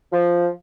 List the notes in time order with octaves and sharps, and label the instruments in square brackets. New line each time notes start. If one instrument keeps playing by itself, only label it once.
[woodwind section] F3